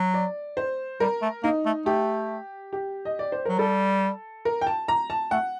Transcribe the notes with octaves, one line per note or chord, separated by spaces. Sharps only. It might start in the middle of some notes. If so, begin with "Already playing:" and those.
Already playing: F#3
D5
C5
G3 A#4
A3
A#3 D#4
A3
A3 G4
G4
D#5
D5
C5
F#3 A#4
G3 A4
A#4
G5
A5
A#5
A5
A3 F#5